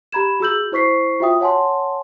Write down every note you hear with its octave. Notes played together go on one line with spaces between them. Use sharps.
G4 A#5 B5 G#6 E7
F#4 G#4 E6 G6 F#7
E4 C5 C#6 B6 C7
F4 F#4 E5 G5 D#6
C#5 F#5 G#5 A5 C6